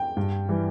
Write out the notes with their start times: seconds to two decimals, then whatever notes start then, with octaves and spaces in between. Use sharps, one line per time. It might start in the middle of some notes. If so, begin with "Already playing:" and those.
Already playing: G5
0.17 G2
0.49 E3 G3